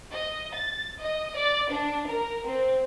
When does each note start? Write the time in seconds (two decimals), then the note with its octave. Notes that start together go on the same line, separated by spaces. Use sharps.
0.12 D#5
0.53 A6
1.00 D#5
1.35 D5
1.70 D4
2.07 A#4
2.44 C4